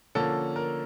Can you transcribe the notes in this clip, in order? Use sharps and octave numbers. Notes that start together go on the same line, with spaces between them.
D3 F3 A#3 C#4 A4
A#4